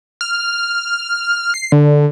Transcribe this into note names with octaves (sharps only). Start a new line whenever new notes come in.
F6
C7
D3